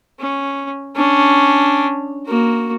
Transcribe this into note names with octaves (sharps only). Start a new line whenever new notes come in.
C#4
C#4 D4
A#3 F#4